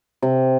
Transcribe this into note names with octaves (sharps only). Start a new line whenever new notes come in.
C3